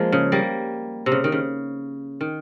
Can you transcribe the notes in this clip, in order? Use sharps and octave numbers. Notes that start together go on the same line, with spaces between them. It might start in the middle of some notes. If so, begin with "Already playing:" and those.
Already playing: F3 G#3 A#3
C#3
G3 A#3
C3
C#3
D#3
C#3
D#3